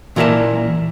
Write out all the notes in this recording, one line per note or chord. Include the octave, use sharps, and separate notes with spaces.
A#2 E3 A#4 D5 E5 A5